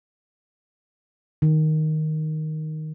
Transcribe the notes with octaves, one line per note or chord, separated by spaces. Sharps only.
D#3